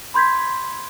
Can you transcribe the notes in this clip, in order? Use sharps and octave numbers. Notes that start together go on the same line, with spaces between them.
B5 C6 G6 G#6 B6